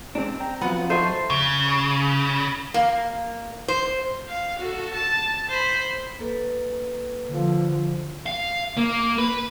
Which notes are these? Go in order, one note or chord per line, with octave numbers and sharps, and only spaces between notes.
G#3 C4 D4
G5 A#5
F3 F#3 B3 F#5
A3 A4 C5 D#5
C#3
A#3
C5
F5
F#4 A4
A5
C5 B5
A#3 A4 B4
D3 F3
F5
A#3
B4